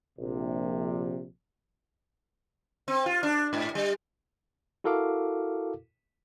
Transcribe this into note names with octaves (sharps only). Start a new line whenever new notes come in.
A#1 C3
C4
F4
D4
G#2
G3
E4 F#4 A4 A#4 F5 D6